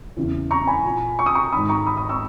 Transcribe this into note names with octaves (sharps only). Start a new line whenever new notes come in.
E2 C#3 E3
A#5 C#6
G#5 B5
A#2
C#6
D#6
A#5 C#6
G#2 D#3 B5 D#6
A#5 C#6
B5 D#6
B5 D#6
C#6 E6